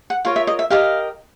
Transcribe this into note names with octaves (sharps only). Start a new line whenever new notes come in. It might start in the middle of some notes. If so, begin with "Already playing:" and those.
F#5
F4 A#4 C#5 F5
E5
D#5
E5
G4 A#4 D#5 F5